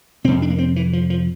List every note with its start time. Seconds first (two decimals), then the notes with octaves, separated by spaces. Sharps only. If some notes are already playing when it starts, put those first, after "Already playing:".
0.24 F2 C3 C4
0.42 D4
0.50 A#3
0.58 C4
0.76 E3
0.93 F3
1.10 F3